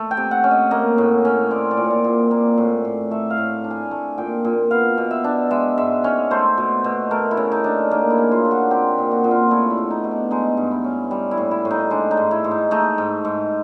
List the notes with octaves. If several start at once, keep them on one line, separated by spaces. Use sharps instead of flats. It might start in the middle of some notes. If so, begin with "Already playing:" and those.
Already playing: A3
G5
C3
F#5
C#4
D#5
A#3 D#5
A2
C#4
C4 D5
D5
A#2
C#5
D5
A#2
A#3
A2
A2
A3 E5
F5
A2
D4
G#5
A3 G#5
A#2 G5
A#2
B3 F5
B2
E5
D4
G#3 E5
G#2 E5
C#4 C#5
A3 C5
B2
B2
A3 A#4
E4
C#3
D#4
D4
A#3 D#4
E4
C#3
F4
D4
F#4
C4 G4
G4
A#2
F#4
A#2
F4
A3 E4
E4
B2
D#4
B2
D4
G#3 D#4
G2
E4
C#4
G3
E4
A2
E4
A2
D#4
G#3 D4
D#4
G#2
E4
G#2
D#4
A3 D#4
G#2
G#2